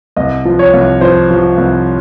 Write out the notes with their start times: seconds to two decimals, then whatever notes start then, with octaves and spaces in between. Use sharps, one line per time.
0.17 C2 D#5
0.45 F3
0.59 C#5
0.74 C2
1.01 F3 C5
1.31 F3
1.58 C2